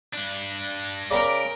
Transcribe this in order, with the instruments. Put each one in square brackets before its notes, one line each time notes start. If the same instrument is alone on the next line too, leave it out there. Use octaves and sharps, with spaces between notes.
[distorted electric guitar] G2 D4
[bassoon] C#3 [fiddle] A#4 G5 [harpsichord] D5 A#5 B5